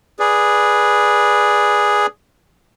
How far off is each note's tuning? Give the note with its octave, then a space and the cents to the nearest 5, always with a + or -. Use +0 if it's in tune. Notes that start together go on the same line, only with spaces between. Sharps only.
G#4 +0 B4 -15 D5 +0